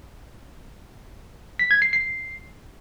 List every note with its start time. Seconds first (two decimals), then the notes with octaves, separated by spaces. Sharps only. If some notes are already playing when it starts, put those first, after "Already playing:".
1.59 B6
1.71 G#6
1.82 C7
1.93 C7